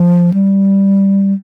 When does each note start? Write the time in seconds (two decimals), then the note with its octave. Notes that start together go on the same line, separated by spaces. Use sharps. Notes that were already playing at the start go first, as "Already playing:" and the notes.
Already playing: F3
0.34 G3